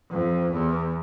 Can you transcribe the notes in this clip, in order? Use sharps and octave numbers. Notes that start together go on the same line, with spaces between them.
F2
E2